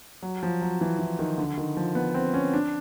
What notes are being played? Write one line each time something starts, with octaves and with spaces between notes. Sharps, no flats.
F#3
F3
F#3
E3
E3
D#3
D3
D#3
F3
B3
C4
C#4
D4